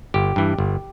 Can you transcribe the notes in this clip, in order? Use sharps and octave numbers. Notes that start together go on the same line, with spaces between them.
G1 G4
G2 E3
G1